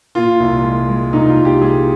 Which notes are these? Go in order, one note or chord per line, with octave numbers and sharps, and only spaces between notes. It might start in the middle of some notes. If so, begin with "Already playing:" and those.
A#2 F4
C2
G#3
G#3
C2 D#4
F4
C2
G4
G#3 G#4